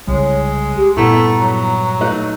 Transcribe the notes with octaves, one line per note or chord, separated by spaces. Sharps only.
C2 C#3 G3 G#3 C#5
G4
G2 A#2 A3 B3 E4 A#5
F#3
A3 D#4 F#6